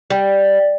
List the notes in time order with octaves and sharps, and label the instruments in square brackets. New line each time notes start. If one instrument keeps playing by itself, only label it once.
[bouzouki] G3